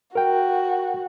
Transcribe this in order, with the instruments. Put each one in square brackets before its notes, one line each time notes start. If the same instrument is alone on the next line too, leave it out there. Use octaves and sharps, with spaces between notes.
[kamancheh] F#4 [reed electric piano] A#4 G5